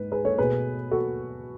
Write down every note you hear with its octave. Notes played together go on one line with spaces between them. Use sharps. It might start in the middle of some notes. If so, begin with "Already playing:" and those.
Already playing: G#2 B4
G#4 B4
A4 C#5
B2 A3 G#4 B4
F#4 A4